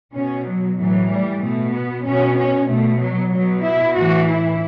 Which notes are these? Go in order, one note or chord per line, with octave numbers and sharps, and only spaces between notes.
B2 C#4
F#3
A2 E3 F#3
G3
B2 A3
B3
B2 C#4
C#4
B2 A3
F#3
B2 F#3
E4
A2 E3 F#4
E4